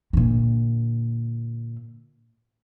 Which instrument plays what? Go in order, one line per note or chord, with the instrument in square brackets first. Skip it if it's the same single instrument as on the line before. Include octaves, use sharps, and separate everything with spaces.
[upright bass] A#2 D3